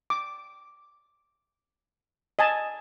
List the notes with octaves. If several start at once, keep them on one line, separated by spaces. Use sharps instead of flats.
D6
D#5 G#5 A5